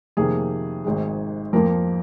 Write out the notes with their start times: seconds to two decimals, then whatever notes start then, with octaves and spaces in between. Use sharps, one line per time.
0.17 F2 C3 D#3 A#3 G#4
0.84 G#1 G#2 D#3 G#3
1.53 F2 F3 A#3 A#4